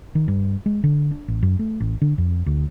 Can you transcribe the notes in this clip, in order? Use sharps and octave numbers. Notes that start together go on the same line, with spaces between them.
D#3
G2
G#3
D3
D4
A1
F#2
A3
A1
D3
F2
D2